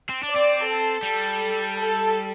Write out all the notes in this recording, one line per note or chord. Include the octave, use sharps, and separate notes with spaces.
C4
D4
D5
C4
A4
G3
A4